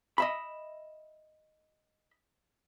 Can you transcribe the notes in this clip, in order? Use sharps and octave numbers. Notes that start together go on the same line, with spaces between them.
D#5 E5 B5